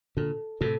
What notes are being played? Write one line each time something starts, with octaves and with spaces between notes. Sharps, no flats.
A#2 D3 A4
A2 C3 A4